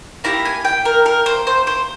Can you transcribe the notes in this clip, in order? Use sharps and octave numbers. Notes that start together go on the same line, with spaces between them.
A#3 E4 G4 A#5
G#5
G5
A#4
A#4
C5
C5
C5